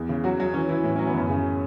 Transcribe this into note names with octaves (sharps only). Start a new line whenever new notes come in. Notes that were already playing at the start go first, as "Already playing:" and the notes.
Already playing: E2
C#3
F#3 F#4
F#3 C#4
E3 C#4
E3 E4
A2 E4
F#3 C#4
B3
F#2 C#4
C#3